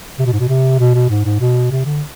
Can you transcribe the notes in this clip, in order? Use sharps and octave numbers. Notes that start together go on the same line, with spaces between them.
C3
B2
G#2
B2
C3
B2
B2
G#2
G#2
B2
C3
D3